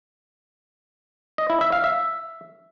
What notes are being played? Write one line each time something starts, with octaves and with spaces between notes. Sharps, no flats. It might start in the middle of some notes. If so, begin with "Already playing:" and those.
D#5
E4
E5
F5
E5